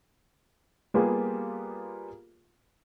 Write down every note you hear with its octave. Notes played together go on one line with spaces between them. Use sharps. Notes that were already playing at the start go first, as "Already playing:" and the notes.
G3 A#3 B3 F4 G4 G#4